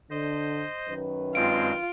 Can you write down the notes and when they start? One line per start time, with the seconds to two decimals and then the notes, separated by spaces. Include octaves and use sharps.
0.10 D3 C5 D#5
0.88 F#2 D#3 B4
1.35 G2 G#3 C4 F4 D7